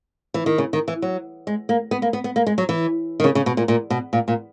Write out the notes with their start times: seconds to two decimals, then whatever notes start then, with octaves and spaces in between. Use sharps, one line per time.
0.34 E3
0.46 D#3
0.58 C#3
0.73 D#3
0.88 E3
1.02 F#3
1.47 G#3
1.69 A#3
1.91 B3
2.02 A#3
2.13 B3
2.24 B3
2.36 A#3
2.46 G#3
2.58 F#3
2.69 E3
3.20 D#3
3.24 C#3
3.35 C#3
3.46 B2
3.57 A#2
3.68 A#2
3.90 B2
4.13 A#2
4.28 A#2